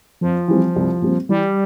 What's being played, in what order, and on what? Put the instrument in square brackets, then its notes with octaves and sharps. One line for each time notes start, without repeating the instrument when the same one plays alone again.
[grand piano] F2 [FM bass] F3
[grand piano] E3 G3 C4
C2
A#2 G3 C4
[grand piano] E3 [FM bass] G3